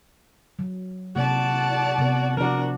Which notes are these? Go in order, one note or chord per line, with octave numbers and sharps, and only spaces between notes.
F#3
C3 A#3 F#4 D5 A5
C3 B3 A#4
F3 D4 F#4 A#4 D5